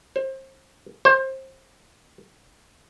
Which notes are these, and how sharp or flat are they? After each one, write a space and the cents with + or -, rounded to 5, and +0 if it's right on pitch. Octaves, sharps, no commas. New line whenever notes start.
C5 +30
C5 +25